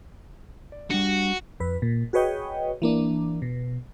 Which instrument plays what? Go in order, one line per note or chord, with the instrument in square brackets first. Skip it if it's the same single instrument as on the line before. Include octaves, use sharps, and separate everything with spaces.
[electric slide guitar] D5
[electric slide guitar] G3 D4 [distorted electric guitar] F#4
[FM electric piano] F2 B4
A#2
F#4 G#4 B4 C#5 D#5 G5
E3 A#3 D4
B2